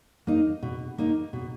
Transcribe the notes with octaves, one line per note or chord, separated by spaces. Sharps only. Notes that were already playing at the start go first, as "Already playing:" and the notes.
A#3 D#4
B2
A#3 D#4
B2